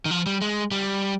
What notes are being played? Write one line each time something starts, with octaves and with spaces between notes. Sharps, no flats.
D#3
F3
G3
G#3
G3